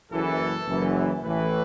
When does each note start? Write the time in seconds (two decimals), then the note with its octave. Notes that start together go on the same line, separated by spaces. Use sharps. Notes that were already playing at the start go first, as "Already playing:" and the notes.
0.11 F#1 F#2 E3 A4
0.67 F#1 F#2 E3
1.24 A1 A2 E3 B4